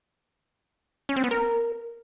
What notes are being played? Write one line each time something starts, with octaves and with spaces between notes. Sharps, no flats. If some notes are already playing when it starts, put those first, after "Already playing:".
C#4
C4
B3
A#4